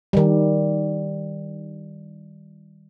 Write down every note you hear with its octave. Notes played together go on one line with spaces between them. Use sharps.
D#3 G3